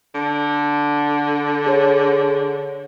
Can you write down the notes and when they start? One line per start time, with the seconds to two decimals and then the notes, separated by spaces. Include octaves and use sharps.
0.15 D3
1.66 G#4 C#5